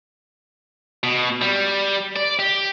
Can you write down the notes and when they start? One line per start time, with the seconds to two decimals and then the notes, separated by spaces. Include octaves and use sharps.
1.03 B2
1.42 G3
2.16 D5
2.39 G4